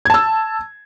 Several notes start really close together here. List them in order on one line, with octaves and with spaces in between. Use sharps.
G#6 A5 E6